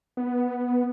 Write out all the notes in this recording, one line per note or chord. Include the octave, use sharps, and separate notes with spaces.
B3